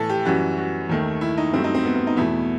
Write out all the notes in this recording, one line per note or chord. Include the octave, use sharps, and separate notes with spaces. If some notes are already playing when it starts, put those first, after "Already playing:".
Already playing: A2 E3 A3 A4
G4
F#2 E3 G3 F#4
F#4
D#2 D#3 A3
E4
D#4
G2 F#3 A3 C4
D#4
C4
B3
B3
D#4
E2 B2 A3 E4